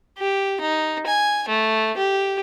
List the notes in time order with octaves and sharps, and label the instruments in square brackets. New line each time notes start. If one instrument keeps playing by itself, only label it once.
[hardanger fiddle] G4
D#4
G#5
A3
G4